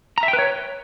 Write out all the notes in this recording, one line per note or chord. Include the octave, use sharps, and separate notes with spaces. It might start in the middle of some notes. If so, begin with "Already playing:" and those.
A#5
E5
G5
B4
C#5